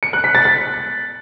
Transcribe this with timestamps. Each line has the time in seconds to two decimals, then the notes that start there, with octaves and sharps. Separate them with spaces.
0.03 C#7
0.13 F#6
0.24 B6
0.35 A6
0.45 F#6